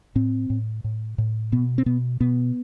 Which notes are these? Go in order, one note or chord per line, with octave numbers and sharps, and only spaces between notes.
A2 C4
A2
A2
A2
B2 B3
C4
B2 B3
B2 B3